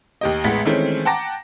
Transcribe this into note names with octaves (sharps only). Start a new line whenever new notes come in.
D#2 G4 D#5
A1 G#3 B3 B6
D#3 E3 G#3 A3 C4 C#4
F#5 G5 A5 A#5 D6 A#6